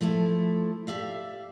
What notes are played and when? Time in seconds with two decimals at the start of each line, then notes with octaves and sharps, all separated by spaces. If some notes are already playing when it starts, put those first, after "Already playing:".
0.01 F3 A3 E4 A4
0.87 G4 D5 E5 F5